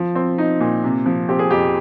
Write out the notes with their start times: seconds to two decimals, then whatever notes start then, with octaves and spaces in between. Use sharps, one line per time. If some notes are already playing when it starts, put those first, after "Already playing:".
Already playing: F3
0.15 C4
0.38 D#4
0.60 A#2
0.84 C3
1.06 F3
1.29 C4 G4
1.39 G#4
1.51 F2 G4